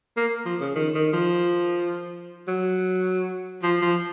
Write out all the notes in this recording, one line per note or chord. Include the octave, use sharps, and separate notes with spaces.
A#3
F3
C#3
D#3
D#3
F3
F#3
F3
F3